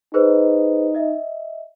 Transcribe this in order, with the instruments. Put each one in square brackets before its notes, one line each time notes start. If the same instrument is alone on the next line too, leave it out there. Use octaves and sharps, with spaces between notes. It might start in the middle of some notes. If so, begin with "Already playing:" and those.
[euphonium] D#4 [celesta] G#4 B4 C5
[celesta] D#5 E5